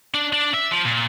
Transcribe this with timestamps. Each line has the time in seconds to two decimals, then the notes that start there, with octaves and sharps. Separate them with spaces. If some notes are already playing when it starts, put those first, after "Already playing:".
0.14 D4
0.33 D4
0.54 E5
0.72 F3
0.86 A#2